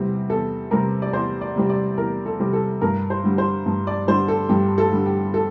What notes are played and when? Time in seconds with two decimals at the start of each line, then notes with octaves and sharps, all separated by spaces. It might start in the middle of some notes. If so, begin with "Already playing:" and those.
Already playing: E2 C3 G3 C4
0.30 E2 A4
0.71 C3 G3 C4 A#4
1.02 D5
1.13 E2 C5
1.41 D5
1.56 C3 G3 C4
1.69 D5
1.98 E2 A#4
2.26 A4
2.39 C3 G3 C4
2.53 A4
2.81 G2 A#4
3.10 C5
3.24 D3 G3
3.38 C5
3.66 G2
3.87 D5
4.07 D3 G3 C5
4.28 A4
4.49 G2 G4
4.78 A4
4.92 D3 G3
5.06 G4
5.34 A4